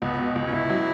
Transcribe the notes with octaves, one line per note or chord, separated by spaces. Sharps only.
C#2 B3
B2
C#2
C#4
C#2 E4
F#3